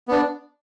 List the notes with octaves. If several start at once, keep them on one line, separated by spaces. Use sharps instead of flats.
B3 D4